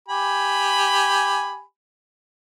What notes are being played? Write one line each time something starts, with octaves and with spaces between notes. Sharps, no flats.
G4 G#5 B5